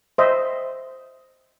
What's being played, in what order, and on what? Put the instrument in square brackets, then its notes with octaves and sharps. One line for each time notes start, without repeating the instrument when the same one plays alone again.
[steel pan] C5 D#5 E5